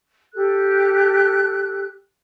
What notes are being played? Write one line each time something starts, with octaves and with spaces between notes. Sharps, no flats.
G4 A4 F#6